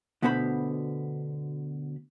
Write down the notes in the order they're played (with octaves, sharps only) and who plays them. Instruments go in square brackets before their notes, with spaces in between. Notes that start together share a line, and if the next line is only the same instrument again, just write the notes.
[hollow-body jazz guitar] D2 B2 D3 B3 C5 B5